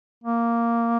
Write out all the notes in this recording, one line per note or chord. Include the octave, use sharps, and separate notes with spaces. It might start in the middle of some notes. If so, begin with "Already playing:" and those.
A#3